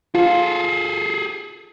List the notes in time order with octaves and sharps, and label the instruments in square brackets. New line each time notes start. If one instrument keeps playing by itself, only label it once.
[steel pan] F4 [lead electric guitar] G#4 A4